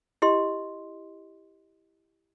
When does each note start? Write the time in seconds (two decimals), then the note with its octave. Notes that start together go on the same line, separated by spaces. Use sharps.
0.22 E4 G4 D#5 C6